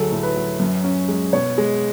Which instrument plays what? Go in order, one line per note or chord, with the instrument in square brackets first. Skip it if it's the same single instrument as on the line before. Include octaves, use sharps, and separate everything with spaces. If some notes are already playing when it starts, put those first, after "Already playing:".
Already playing: [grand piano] D2 F#3 [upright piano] G#4 A4
[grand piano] A2
[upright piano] B4
[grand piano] F#3
F#2
C#4
G#3
[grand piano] B2 [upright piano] C#5
[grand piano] G#3